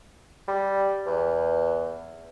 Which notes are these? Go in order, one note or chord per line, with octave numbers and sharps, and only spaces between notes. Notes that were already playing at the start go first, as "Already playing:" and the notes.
G3
E2